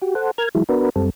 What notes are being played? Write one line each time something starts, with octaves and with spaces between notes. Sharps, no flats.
F#4 G4
A4 C5 F#5
A#4 F6 G#6
E3 F#3 G#3 E4
B3 D4 F#4 A#4 B4
F#2 G3 C4 A4